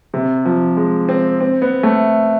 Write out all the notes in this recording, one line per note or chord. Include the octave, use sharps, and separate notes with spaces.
C3
F3
G#3
C4
C4
B3
A3